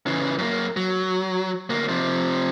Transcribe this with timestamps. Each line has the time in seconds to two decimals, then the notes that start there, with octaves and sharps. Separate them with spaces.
0.06 C#3 E3
0.38 F#2 A#3
0.77 F#3
1.70 D2 A#3
1.89 C3 F3